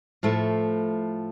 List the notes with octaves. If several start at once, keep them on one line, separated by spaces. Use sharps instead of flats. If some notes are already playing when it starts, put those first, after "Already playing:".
A2 F3 A3